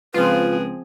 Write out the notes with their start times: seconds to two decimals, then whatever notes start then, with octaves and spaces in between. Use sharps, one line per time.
0.14 C#2 F3 C4 F4 G#4 B4